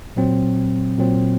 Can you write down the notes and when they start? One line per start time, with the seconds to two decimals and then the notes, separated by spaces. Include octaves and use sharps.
0.16 A#2 F#3 C4
0.98 A#2 F#3 C4